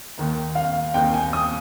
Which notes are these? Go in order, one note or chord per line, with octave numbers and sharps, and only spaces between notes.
D#2 D#3 A#3
F5
D#2 D#3 A#3 G5
G#5
D#6